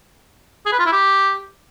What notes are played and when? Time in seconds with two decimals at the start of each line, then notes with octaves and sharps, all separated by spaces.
0.66 G#4
0.73 B4
0.79 F4
0.86 E4
0.93 G4